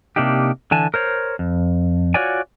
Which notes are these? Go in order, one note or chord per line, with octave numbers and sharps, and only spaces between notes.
C3 A#3 D4 D#4 G4
D3 E3 G#5 A5
A#4 C5 C#5
F2
F4 F#4 C#5 D5 G#5